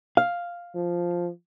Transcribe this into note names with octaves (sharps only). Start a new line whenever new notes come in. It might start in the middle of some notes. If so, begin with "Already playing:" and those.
F5
F3